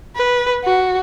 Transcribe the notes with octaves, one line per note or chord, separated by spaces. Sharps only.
B4
F#4